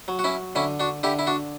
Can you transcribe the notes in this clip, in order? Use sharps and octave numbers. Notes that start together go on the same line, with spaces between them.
F#3
F#4
C#4 E4
D3 C#4 E4
D4 F#4
D3 E4 G4
E4
D4 F#4